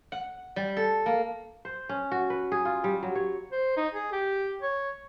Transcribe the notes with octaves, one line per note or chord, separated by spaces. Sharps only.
F#5
G3
A4
A#3
C5
C#4
F#4
B4
G#4
F4
G3
F#3
C#5
C5
D#4
G#4
G4
C#5